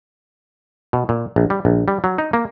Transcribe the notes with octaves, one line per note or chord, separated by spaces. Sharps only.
B2
A#2
A#1
G3
A#1
G3
F#3
D#4
A#3